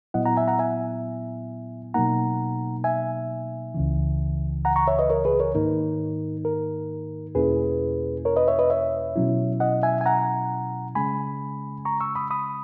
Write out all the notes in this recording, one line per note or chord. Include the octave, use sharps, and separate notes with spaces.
A#2 F#3 B3 E4 D#5 F#5
F#5 A#5
E5 G#5
F#5 A#5
E5 G#5
B2 F#3 A#3 D#4 F#5 A#5
E5 G#5
C#2 C#3 E3
F#5 A#5
A#5 C#6
C#5 E5
B4 D#5
A#4 C#5
G#4 B4
A#4 C#5
G#2 D#3 A#3 D#4 A#4
A#4
E2 B2 A#3 C#4 E4 G#4 B4
A#4 C#5
B4 D#5
C#5 E5
B4 D#5
C#5 E5
B2 F#3 C#4 E4
D#5 F#5
E5 G#5
G#5
F#5 A#5
C#3 G#3 C#4 G#5 B5
A#5 C#6
C#6 E6
B5 D#6
B5 D#6